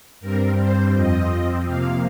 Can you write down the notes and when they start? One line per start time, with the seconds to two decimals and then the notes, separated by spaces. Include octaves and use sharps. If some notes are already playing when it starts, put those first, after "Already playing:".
0.20 G2 G3 C4 A#4
0.57 C5
0.94 F2 F3 C4 D#5
1.66 C3 F3 A#3 F5